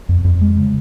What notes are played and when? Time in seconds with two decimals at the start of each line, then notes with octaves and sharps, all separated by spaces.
0.09 F2
0.25 F2
0.41 G#3
0.57 C#3